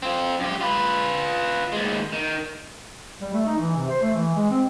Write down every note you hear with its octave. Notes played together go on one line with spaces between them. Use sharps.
C4 F4
F#2 G4
F4 B4
D#2 G#3
D#3
G3
A3
D#4
E3
C3
C5
A3
E3
G#3
C4